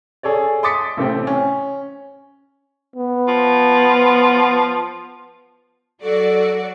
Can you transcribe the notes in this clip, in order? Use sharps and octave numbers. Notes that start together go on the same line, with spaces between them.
G#4 A4 C#5 D5
C6 D6 D#6 A6 B6 C#7
A1 C3 A3 C4 G5
C#4
B3
F3
F#3 F#4 A4 D5